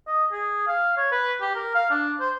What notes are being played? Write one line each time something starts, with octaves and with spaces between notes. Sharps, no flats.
D#5
G#4
F5
C#5
B4
G4
A#4
F5
D4
C5